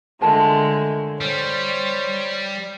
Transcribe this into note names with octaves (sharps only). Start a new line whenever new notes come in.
D3 G#3 A3 F4 A#4 A5
G3 C5 C#5